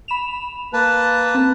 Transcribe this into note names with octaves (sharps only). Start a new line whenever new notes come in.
B5 E7 F7
A#3 B4 A5
C4